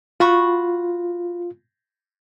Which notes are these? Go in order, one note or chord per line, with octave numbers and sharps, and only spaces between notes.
F4 F#4 B5 C#6